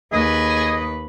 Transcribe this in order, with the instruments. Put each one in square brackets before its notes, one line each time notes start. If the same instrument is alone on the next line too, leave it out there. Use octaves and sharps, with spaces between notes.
[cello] D#2 B4 [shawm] G#4 [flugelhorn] D#5